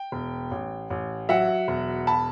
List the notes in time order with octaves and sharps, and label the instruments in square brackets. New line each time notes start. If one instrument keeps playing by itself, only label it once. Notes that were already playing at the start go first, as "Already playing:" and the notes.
Already playing: [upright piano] G5
E1
A1
A1
F#3 E5 F#5
E1
A5 B5